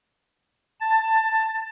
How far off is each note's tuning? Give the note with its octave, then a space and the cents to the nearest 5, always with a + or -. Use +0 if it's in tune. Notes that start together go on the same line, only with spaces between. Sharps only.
A5 +15